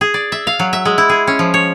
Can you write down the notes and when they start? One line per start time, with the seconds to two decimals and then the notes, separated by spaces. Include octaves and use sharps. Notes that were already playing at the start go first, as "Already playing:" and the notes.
0.01 G#4
0.14 D5
0.32 E5
0.47 F5
0.59 F#3
0.73 E5
0.85 G#3
0.98 E4
1.09 G#4
1.27 C#4
1.39 F3
1.54 C#5